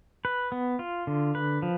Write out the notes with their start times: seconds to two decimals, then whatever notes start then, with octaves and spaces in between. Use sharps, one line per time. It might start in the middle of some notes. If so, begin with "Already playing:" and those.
0.25 B4
0.52 B3
0.79 F4
1.07 D3
1.35 B4
1.62 F3